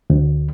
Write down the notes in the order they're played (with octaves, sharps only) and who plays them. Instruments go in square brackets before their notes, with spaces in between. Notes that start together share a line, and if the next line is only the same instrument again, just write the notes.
[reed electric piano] D2